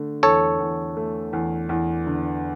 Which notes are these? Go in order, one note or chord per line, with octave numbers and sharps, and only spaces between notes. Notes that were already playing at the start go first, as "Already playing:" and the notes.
Already playing: D3 A3
E2 A4 C#5
E2
A3
E2
E2
D3